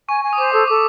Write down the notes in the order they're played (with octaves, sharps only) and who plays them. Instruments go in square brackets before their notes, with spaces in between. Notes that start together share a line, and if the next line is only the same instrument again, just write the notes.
[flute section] G#5 [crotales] C#6
[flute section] G#5
[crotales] D#6
[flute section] C5 [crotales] D6
[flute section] A4 [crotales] D#6
[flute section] A4 [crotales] D6